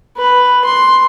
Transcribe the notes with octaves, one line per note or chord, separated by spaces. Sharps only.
B4
C6